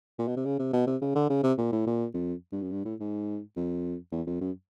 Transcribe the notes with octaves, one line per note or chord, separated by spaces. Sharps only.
A#2
B2
C3
C#3
C3
B2
C3
C#3
D3
C#3
C3
A#2
A2
A#2
F2
G2
F#2
G2
A2
G#2
F2
E2
F2
F#2